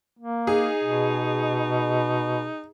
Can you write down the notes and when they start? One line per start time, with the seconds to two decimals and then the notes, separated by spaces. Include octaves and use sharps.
0.19 A#3
0.47 D#4 G#4
0.84 B2